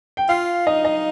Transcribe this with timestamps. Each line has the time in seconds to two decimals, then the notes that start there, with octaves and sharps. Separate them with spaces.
0.17 G5
0.29 F4 F5
0.67 D#4 D#5
0.85 D#5